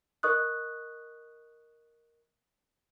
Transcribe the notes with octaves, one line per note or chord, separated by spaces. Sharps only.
A#4 D#5 C#6 D#6 F#6